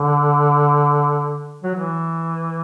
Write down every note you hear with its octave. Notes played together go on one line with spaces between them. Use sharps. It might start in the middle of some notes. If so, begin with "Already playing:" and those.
Already playing: D3
F#3
E3